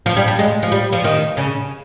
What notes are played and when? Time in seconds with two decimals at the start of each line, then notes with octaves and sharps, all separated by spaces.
0.06 F3
0.17 G3
0.28 G3
0.39 G#3
0.63 F3
0.72 G3
0.93 F3
1.04 D#3
1.37 C#3